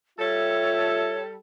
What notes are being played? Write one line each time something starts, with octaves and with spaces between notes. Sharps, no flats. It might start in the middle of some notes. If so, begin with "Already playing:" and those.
G3 F4 A4 C#5 E5